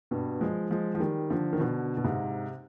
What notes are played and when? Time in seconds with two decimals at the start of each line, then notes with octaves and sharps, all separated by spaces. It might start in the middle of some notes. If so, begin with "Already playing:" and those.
0.11 G2 B2
0.41 F3 G#3
0.70 F3 G#3
0.95 F3
1.00 D#3 G3
1.30 D3 F3
1.53 D#3
1.60 B2 D3
1.97 B2
2.04 G#2 C3